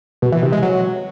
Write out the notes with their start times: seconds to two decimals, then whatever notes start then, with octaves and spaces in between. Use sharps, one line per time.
0.22 B2
0.32 E3
0.42 C3
0.52 G#3
0.62 F#3